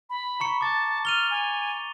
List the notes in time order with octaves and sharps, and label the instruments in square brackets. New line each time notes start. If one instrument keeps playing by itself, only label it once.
[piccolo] B5
[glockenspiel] A#5 C#6 C#7
[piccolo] A5 [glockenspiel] D6 A6
[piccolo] F6 [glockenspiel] D#7 F7 G7
[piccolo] G#5